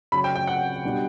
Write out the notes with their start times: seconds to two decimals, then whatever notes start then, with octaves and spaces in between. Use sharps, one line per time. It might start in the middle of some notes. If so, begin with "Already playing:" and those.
0.12 C#3 F#3 C#4 B5
0.24 G5
0.36 G5
0.47 F#5
0.83 B2 G3 D4